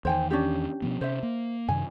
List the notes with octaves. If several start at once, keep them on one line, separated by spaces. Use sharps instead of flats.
E2 D#3 C5 G5 G#5
C#4 D4 G4
B2 F3 B3
C3 C#4 C5 E5
A#3
F#2 C3 D#3 G#5